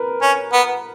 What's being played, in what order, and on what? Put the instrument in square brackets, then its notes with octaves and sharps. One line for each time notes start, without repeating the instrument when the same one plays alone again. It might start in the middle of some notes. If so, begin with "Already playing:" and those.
Already playing: [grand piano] A#4 B4
[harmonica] C#4
B3